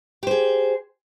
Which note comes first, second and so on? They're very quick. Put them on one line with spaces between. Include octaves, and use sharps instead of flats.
G4 C5 G#4